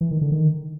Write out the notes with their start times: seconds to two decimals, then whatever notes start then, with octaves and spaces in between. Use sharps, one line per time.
0.01 E3
0.11 D#3
0.21 D3
0.32 D#3